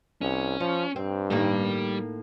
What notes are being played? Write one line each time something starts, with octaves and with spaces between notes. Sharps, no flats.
C2 C#4
F3 C#5
G2 C4
A2 D#3 G3 A#3 G4